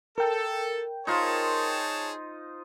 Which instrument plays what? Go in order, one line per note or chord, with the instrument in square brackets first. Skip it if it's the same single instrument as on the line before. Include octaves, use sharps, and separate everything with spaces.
[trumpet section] A4 [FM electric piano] A#4 G5
[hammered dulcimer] D#4 F4 C5 [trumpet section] G#4 C#5 A5